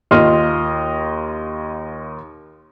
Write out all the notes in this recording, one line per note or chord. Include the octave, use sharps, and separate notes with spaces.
D#2 F4 D#5 C6 D#6 F6